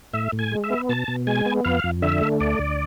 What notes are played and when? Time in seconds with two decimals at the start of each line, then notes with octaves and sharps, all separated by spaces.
0.13 A2 E5
0.32 A2
0.39 G#5
0.52 G#3
0.64 E5
0.70 B3
0.89 B2 A5
1.08 B2
1.27 G#3 G#5
1.46 B3
1.65 F2 F5
1.84 F2
2.02 D3 E5
2.21 A3
2.40 D2 D5
2.59 D2